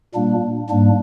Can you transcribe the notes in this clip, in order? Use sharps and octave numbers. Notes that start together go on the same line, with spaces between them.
A#2 G3 A#3 D4
G#2 G3 A#3 D4